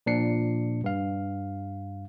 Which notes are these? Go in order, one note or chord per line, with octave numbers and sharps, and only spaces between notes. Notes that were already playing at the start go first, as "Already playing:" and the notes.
A#2 F3 D4 C7 C#7
G2 F5